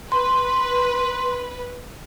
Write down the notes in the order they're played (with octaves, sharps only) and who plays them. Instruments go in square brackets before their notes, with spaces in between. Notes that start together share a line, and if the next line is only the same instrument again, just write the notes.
[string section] B4 [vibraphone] C6